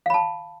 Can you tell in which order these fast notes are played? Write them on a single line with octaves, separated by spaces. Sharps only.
F5 B5 A5